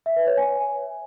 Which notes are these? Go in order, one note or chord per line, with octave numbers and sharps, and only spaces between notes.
E5
B4
C#5
G#5